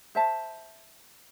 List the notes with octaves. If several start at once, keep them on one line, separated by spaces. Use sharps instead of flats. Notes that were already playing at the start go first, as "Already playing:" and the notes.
C5 E5 A5